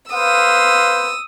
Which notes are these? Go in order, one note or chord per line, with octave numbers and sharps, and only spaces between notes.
B4 C5 F5 D#6 E6